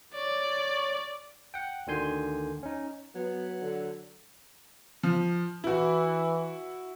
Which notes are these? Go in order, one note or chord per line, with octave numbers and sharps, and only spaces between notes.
C#5 D5
F#5 G5
D2 D3 D#3 G#5 C6 G6
C#4 D#4
F#3 B3
D3
F3
E3 E4 F#4